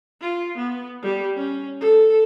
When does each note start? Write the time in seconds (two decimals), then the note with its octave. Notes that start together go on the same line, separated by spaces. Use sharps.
0.21 F4
0.57 B3
1.03 G3
1.37 C#4
1.80 A4